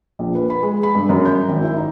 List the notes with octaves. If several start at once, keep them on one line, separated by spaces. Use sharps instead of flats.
A#1
B4
B5
G#3
B5
G2
F#2
G6
G#1
E4
D#4